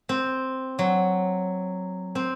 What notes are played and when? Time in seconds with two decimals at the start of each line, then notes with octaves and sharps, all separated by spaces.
0.09 C4
0.79 F#3
2.15 C4